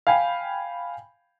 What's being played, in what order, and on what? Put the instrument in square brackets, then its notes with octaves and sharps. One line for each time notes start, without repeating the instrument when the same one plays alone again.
[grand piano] F5 G5 G#5 B5